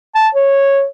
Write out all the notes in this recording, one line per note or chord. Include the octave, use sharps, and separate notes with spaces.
A5
C#5